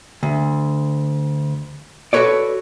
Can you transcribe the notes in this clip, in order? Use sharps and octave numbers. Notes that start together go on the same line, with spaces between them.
D2
F#4 A4 B4 C#5 D5